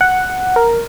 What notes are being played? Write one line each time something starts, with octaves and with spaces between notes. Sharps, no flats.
F#5
A#4